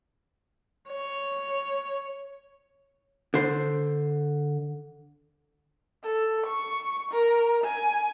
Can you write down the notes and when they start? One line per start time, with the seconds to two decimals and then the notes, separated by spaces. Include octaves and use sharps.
0.91 C#5
3.34 D3 C5
6.04 A4
6.47 C#6
7.11 A#4
7.64 G#5